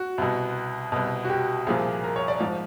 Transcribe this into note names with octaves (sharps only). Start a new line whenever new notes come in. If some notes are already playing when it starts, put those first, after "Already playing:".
Already playing: F#4
C2 B2
C2 B2
F#4
G4
C2 A#2 F3 G#4
A#4
C#5
D5
G#2 F3